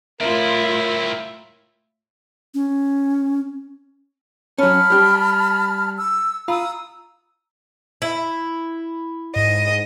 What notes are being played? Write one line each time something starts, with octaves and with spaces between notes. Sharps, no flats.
A2 C4 E4 F4 A#4 E5
C#4
F#3 C#4 A5 B5 F6
G3 G4
E6
F4 F5 A#5 B5 D#6 E6
E4
G#2 D#5